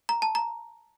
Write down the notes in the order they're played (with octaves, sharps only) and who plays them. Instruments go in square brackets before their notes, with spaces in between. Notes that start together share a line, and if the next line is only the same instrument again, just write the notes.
[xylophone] A#5
A5
A#5